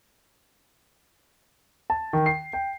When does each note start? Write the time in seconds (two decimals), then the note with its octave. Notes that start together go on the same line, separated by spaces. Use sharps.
1.90 A5
2.13 D#3
2.26 C7
2.53 G5